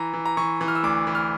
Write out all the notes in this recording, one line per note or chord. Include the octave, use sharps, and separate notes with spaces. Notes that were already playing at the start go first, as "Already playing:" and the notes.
Already playing: E3 A#5
E3
A#5
E3 C#6
E3
F6
E6
D2 D6
E3
F6